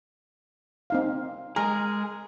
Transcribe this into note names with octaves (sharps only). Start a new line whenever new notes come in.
C4 D#4 F5
G#3 G#4 A#4